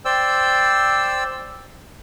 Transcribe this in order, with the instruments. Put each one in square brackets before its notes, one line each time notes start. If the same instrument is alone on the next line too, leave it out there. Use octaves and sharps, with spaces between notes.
[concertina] C5 D5 G5 E6